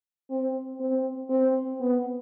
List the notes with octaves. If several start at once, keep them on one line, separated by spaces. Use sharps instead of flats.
C4
C4
C4
B3